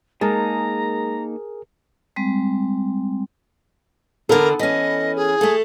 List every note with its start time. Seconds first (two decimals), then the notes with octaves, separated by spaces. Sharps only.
0.21 G#3 A#3 D#4 G#4 A#4 A5 A#5
2.16 G3 G#3 C4
4.29 E2 D3 B3 A4 A#4
4.59 E3 C#4 D#5
5.16 G#4
5.41 A3 A4